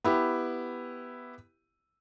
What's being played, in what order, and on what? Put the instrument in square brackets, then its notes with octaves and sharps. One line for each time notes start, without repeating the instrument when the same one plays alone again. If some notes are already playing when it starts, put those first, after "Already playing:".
[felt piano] B3 E4 G4